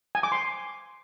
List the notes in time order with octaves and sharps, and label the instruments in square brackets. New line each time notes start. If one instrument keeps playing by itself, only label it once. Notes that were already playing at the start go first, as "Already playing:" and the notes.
[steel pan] G#5
D6
C6